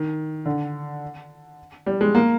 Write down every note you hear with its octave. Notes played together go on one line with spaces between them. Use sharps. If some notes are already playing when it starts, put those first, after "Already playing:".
Already playing: D#3
D3
G3
G#3
A#3